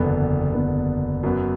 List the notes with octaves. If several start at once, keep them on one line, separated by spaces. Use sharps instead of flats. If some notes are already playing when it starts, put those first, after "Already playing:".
Already playing: F#1 E2 D3 B3
F#1 E2 D3 B3
F#2 F#3 B3